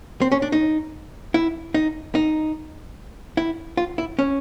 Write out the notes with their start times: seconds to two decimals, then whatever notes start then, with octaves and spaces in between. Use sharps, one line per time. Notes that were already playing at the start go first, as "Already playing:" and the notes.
0.22 C4
0.32 C#4
0.42 D4
0.52 D#4
1.34 E4
1.74 D#4
2.15 D#4
3.37 E4
3.77 F4
3.98 E4
4.19 C#4